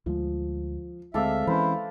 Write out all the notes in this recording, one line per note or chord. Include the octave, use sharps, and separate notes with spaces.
D2 F3 G#3
D2 G#3 C4 A4 D5 E5 F5
E3 C#4 E4 B4 C5